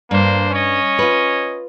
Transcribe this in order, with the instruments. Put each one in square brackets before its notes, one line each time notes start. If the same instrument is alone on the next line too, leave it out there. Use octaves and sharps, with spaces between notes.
[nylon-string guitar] G2 [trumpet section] A#3 D4 C5
[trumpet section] C#4 C#5 D#5
[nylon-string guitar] F4 B4